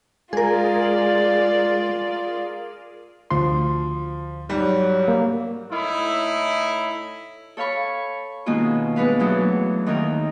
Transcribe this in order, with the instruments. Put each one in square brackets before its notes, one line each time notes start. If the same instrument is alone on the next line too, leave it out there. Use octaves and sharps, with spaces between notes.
[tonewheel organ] G#3 [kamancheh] F4 D5 [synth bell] G#4 A#4
[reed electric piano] D2 C6 [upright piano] F3
[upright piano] G#2 G3 [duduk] F#3
[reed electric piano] A#3
[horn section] A2 D#4 E4
[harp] A4 C#5 F5 B5 C#6
B2 D#3 G#3 A#3 C#4 F4
G#3 B3 D4 B4 F5
E2 F#3 A3 D4
D#2 D#3 A3 C4 A#4